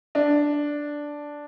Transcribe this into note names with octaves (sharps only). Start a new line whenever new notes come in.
D4